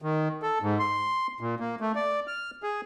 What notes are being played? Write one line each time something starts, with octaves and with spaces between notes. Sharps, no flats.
D#3
A4
G#2
C6
A#2
A#3
A3
D5
F6
G#4